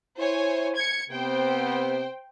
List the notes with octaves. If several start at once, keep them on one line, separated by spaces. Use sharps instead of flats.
E4 C5 C#5 G#5
G#6 C#7
C3 B3 C4 C5 G5